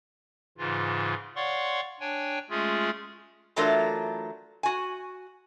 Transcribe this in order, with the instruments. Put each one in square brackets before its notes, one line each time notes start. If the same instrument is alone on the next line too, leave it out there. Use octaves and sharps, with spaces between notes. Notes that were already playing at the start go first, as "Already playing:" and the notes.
[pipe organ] G#2 C#3 E3 F4
C#5 D5 F5 F#5 C6 C#6
D4 C#5 G5 G#5
G#3 A3 C#4 F4 G#4
[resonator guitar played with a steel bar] E3 F#3 A3 D4 F4 A#4
F#4 G#5